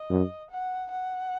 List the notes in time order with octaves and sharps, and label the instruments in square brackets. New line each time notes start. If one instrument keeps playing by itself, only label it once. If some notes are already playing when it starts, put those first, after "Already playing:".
Already playing: [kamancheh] D#5
[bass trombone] F#2
[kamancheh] F#5
F#5